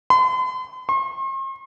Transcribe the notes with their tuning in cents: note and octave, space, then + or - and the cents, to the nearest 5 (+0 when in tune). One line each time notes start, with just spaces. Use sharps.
C6 -45
C6 +45